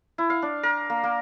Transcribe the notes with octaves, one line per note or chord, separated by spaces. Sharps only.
E4
F5
D4
A#4
A#3
A#3